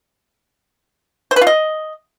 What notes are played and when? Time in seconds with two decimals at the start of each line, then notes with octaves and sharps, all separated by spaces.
1.31 C5
1.36 B4
1.41 F4
1.47 D#5